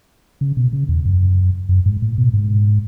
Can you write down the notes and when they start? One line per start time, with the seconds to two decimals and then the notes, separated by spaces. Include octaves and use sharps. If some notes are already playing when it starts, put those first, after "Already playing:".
0.41 C#3
0.57 B2
0.73 C#3
0.89 E2
1.05 F#2
1.69 F#2
1.86 G#2
2.02 A2
2.18 B2
2.33 G#2